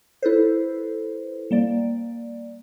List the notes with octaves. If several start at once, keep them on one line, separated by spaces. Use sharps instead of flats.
E4 A4 B4 C5
G3 A#3 D5